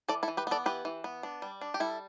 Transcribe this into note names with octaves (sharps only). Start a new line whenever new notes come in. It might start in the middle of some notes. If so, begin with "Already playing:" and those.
E3 A4 D5
E4 A4
E3
G4 B4
B3 A4 D5
E3 G4 B4
E3
B3
D4
G3
D4
G4
G3 E4 A4